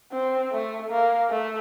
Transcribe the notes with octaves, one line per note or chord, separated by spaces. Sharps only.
C4
A3
A#3
A3